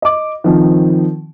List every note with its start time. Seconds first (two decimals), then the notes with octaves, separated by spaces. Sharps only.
0.02 D#5 D6
0.44 D#3 F3 C4